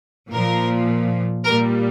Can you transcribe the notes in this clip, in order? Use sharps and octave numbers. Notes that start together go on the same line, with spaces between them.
A#2 F3 A#4
A#2 G3 A#4